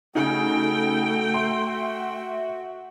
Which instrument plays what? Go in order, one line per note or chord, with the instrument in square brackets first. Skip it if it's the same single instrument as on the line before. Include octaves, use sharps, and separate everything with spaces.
[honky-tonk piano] C#3 D#4 [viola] A3 G5 [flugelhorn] F#4 [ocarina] A4
[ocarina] E5 [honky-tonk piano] C6